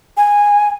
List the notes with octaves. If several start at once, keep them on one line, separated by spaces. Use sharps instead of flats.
G#5